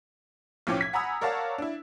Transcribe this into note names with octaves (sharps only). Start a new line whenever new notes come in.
B1 A2 F3 C#4 G5 D6
G#6 B6
F#5 G#5 A#5 B5 D#6 E6
A#4 C#5 D5 F5 F#5 A5
D4 E4